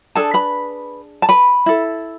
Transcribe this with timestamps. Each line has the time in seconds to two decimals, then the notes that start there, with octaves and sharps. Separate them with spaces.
0.15 D4 G#4 A4 A5
0.34 B4 B5
1.22 A5
1.29 B4 B5
1.66 E4 A4